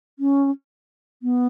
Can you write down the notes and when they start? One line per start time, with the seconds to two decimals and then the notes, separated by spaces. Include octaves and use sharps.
0.19 C#4
1.23 B3